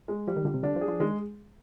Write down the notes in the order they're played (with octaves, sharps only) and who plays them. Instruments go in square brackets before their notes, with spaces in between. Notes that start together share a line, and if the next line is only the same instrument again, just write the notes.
[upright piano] G#3
[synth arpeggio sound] F3 [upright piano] G3
[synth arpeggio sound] D#3
[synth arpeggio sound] D3 [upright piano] G3
[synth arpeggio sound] C3
[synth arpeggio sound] D3 [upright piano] D4
[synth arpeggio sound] F3
[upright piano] G#4
[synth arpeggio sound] F3
[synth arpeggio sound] D#3 [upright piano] G#3